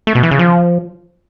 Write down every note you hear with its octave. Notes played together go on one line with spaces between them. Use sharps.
A3
B2
E3
C#3
F3